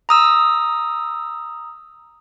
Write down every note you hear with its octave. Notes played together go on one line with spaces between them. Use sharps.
A#5 D#6 E6